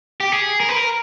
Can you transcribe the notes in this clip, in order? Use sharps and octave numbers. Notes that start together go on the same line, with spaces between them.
G4
G#4
A#4
B4
A#4